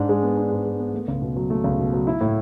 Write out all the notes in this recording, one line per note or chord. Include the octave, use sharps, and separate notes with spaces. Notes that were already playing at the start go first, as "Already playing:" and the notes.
Already playing: G#2 D4
G#3
B3
D4
G#2
G#3
B3
A3
C#2
B2
F#3
A3
C#2
B2
F#3
E4
A2